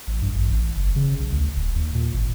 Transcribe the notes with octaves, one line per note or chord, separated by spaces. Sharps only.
A1
G2
A1
A1
F#1
C#3
B1
D2
D1
D#2
A#2
G#1